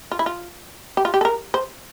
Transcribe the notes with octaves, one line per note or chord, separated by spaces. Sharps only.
F4
E4
F4
G4
F4
G4
A4
A#4
C5